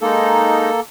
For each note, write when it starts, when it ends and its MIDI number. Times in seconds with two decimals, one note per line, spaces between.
0.01 0.70 56
0.01 0.80 58
0.01 0.70 63
0.01 0.80 69